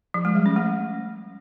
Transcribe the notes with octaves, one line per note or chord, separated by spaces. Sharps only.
F3
G#3
G3
C#4
A3